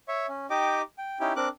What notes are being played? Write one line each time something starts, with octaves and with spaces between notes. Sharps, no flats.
C#5 E5 C#6
C#4
D#4 G4 D#5 G5 D6
G5
C#4 D#4 E4 G4 G5
C4 D4 A#4 D6 F#6